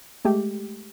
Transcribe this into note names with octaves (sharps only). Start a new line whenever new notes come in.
G#3 A3 G4